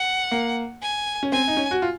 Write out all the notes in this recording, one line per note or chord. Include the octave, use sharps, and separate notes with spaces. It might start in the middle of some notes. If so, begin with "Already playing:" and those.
Already playing: F#5
A#3
G#5
C#4
C4 G#5
D#4
C#4
F#4
F4